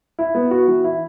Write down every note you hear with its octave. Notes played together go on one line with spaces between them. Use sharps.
E4
B3
F#4
E3
E4